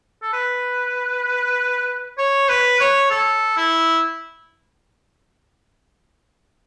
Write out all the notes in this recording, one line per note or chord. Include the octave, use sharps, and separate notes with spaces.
A4
B4
C#5
B4
C#5
A4
E4